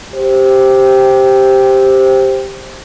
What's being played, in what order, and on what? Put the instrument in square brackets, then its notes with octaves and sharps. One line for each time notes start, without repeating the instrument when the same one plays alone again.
[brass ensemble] G4 C5